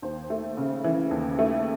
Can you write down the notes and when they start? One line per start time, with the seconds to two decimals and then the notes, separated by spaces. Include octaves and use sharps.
0.02 D#2 C5
0.30 A3
0.57 C#3
0.84 E3
1.11 D#2
1.39 A3